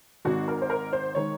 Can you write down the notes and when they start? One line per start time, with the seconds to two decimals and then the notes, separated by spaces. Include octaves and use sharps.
0.25 G#1 G#2 D#3 G#3 F#4
0.48 A#4
0.62 C5
0.70 A#4
0.93 C5
1.15 D#3 G#3 C#5